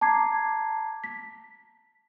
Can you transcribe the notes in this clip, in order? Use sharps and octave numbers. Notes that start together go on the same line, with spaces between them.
A5 A#5 D6 G#6 C7
B6